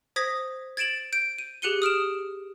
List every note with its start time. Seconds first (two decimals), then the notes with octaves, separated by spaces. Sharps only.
0.16 C5 D#6 G#6 A#6 B6
0.77 G#6 A6 D7 E7 F#7
1.13 G6 D7
1.38 D#7
1.62 G4 G#4 F#6 C#7 D#7 G7
1.82 D#6 F6 D7 E7